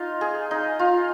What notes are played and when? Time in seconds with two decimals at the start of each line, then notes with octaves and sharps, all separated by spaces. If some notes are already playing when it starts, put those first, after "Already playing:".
Already playing: D#4 F4
0.21 G#4
0.51 D#4
0.79 F4